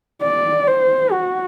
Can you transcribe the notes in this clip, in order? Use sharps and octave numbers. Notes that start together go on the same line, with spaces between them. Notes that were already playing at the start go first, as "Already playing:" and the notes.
D5
C5
F#4